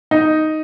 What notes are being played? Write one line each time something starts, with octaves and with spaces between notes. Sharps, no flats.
D#4